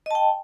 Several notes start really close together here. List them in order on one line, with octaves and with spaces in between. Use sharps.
D#5 A5 G5